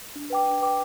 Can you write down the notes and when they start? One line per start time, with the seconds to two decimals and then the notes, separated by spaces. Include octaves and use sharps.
0.16 D4
0.30 B4 G5 D6
0.46 D4
0.62 B4 G5 D6